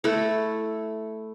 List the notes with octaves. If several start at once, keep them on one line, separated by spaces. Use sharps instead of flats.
A3 E4